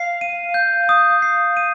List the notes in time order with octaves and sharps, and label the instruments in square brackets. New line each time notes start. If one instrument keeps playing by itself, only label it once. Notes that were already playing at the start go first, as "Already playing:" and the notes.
Already playing: [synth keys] F5 [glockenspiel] C7
[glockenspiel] D#7
G6
D#6
C7
D#7